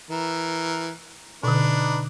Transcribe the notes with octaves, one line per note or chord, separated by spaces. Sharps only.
E3 A#4
B2 D3 D4 D#4 B4